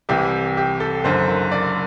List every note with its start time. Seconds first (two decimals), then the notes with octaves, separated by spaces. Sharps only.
0.09 C2 C3 E3 G4
0.57 G4
0.80 A4
1.04 F#1 F#2 D3 C5
1.51 D5